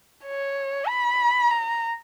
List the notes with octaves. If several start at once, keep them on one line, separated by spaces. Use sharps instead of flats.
C#5
B5
A#5